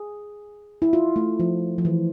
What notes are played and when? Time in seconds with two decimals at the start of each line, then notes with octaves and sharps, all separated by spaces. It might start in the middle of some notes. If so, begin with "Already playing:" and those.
Already playing: G#4
0.82 E4
0.93 F4
1.16 A3
1.40 F3
1.78 F3
1.85 E3